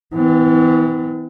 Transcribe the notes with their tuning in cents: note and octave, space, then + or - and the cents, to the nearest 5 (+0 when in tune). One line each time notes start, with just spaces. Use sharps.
E3 -25 B3 +40